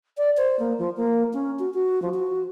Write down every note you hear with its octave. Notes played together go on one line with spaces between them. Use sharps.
D5
C5
A#3
F3
A#3
C#4
F#4
F#4
F3
F#4